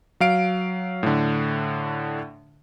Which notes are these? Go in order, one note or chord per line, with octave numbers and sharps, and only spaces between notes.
F#3 F5 D7
A2 D3